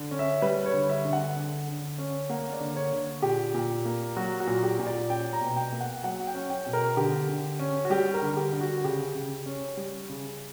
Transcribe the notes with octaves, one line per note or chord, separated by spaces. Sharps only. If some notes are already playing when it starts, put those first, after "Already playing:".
Already playing: D3
C#4
E5
G3 B4
C#5
D3
E5
D3
F#5
D3
D3
C#4
A#3 F#5
D5
D3
C#5
D3
A#2 G4
A#2
A#3
F#3 F#4
F#4
A#2
G4
A#2
D5
C#4 G5
A#5
B2
G5
A#3
F#5
F#3 F#5
G5
C#4
G5
B2
A#4
D3 G4
D3
C#4
F#4
G3 G4
A#4
D3
G4
D3
F#4
C#3 G4
C#3
C#4
G3
C#3